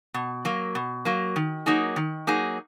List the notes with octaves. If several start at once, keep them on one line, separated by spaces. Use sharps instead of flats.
B2
F#3 A#3
B2
F#3 A#3
D#3
F#3 A#3 D#4 G#4
D#3
F#3 A#3 D#4 G#4